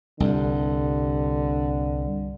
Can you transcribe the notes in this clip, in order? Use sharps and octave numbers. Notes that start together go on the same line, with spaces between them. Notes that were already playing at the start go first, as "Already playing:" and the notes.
C2 G2 D3